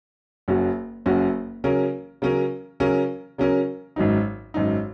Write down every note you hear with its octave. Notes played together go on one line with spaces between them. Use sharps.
F#1 F#2 F#3 C#4 F#4
F#1 F#2 F#3 C#4 F#4
C#3 F#3 C#4 A#4
C#3 F#3 C#4 A#4
C#3 F#3 C#4 A#4
C#3 F#3 C#4 A#4
G#1 F#2 F#3 D#4
G#1 F#2 F#3 D#4